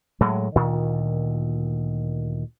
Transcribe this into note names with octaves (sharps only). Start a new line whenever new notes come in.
A2 F#3 G#3
D2 A#2 D#3